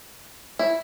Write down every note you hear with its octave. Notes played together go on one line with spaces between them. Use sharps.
E4